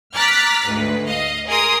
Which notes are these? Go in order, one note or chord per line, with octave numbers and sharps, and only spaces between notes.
A#5 D6 F6 F#6 A6 B6
D2 G#2 B4
D#5 F5
G#4 A#4 A#5 C6 D#6